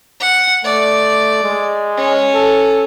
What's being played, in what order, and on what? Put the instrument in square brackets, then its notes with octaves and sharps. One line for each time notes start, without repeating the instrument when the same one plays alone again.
[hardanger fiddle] F#5
[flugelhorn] A3 [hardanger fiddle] D5
[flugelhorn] G#3
[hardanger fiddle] C#4
[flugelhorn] A4